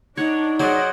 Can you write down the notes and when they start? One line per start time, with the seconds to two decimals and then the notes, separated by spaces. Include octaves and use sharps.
0.17 D4 D#4 C#5 F#5
0.60 F#3 G#4 C5 D5 D#5 F#5